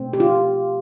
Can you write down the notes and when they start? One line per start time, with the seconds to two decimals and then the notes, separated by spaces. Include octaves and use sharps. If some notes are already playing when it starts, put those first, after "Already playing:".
Already playing: B2 A3 C4
0.13 G4
0.20 F4